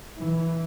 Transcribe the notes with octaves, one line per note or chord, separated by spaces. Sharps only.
E3